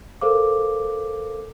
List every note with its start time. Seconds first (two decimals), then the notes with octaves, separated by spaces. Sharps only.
0.21 A4 A#4 C5 F5 D6